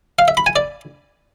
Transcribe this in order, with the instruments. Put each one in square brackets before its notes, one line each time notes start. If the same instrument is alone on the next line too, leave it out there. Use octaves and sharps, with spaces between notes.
[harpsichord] F5
E5
B5
G#5
D5